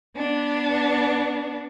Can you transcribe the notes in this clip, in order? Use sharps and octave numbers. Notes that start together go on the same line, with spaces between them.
B3 D4